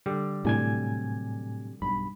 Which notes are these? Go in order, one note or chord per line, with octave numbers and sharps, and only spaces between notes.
D3 G3
A2 C3 F#3 D4 G#5 G#6
B1 G2 B5